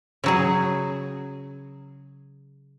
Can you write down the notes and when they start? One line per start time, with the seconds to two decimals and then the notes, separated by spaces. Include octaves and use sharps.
0.24 C#3 F#3 G#4